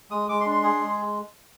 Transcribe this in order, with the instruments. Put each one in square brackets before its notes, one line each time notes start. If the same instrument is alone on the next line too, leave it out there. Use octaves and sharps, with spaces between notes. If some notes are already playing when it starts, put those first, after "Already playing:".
[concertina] G#3 D#6
G#3 D6
C6
D4
C6
G#4
G#3